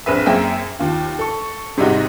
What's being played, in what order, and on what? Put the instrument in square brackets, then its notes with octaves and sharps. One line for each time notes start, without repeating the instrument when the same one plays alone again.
[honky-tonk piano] A#1 C4 G#4 B4 E5
F#2 A#3 C4 G#4 E5 G5
D#2 F4
A4 C#6
G#2 C3 G3 G#3 D#4 F#4